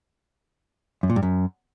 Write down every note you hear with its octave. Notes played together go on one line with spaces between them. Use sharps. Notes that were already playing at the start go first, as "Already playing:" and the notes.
F#2
A#2
G2
F#2